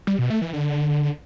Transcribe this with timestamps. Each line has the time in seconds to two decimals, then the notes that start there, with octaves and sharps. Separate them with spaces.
0.07 G3
0.19 B2
0.30 A3
0.42 E3
0.53 D3